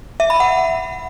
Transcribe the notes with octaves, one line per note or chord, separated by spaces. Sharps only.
E5
B5
F#5